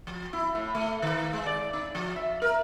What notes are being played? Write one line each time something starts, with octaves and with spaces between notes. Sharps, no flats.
F3
E4
A2
A3
D#3
G#3
D5
D#4
F3
E5
A#4